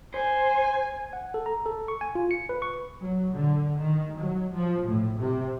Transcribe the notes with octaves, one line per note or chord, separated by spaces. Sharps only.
C5 G#5
F#5
A4
A#5
A4
C#6
G#5
F4
C#7
B4
C#6
F#3
D3
D#3
F#3
F3
A2
C3